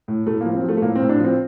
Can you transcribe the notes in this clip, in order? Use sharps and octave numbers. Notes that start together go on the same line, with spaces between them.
A2
A2 A3
A#3
F3
C4
F3 A3
A3
A2 A#3
C4
A2
D4
F3
C4